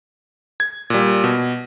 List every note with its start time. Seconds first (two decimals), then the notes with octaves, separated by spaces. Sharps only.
0.60 G#6
0.90 A#2 G3
1.24 B2